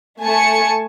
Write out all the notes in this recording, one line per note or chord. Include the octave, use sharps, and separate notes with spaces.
A3 G#5 A5 C#7